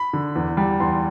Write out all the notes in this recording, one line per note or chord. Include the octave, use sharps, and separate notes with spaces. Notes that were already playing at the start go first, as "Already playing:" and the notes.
Already playing: B5
D3
E2
G3
E2 C6